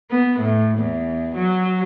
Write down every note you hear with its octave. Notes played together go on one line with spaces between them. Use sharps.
B3
A2
E2
F#3